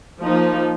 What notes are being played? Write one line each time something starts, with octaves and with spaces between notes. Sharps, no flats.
F3 A#3 D#4